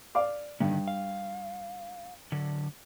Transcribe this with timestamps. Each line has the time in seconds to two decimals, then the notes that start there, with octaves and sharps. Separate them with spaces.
0.15 D5 F5 D6
0.60 G2 D3 D#3
0.88 F5
2.32 D3 F#3